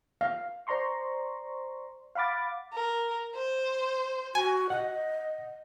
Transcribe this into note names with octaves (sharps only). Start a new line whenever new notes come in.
F5
C5 D5 A#5 C6 C#6
F5 F#5 B5 D6 A6
A#4
C5
F#4 G#5
D#5 F#5